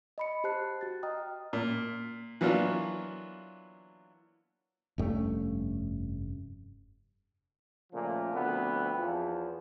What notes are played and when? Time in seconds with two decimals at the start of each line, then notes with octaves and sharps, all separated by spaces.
0.18 D#5 B5 C#7
0.44 G4 C5 A5 F#6 C7
0.81 F#4 A6
1.03 D#5 G5 A#5 D#6 F6
1.53 A#2
2.41 E3 F#3 A#3 B3 D4 F4
4.98 F1 G2 A3 C#4
7.92 A#2 C#3 F3 A3
8.33 D2 F3 B3 C4
8.96 E2 F3